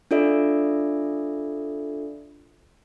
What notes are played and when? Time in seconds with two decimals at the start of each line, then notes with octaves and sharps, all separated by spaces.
0.11 D4 F4 A4 D5 E5